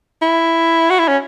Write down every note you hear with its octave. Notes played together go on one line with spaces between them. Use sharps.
E4
F#4
E4
C#4